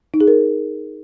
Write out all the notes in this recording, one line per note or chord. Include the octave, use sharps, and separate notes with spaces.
D#4
G#4
A#4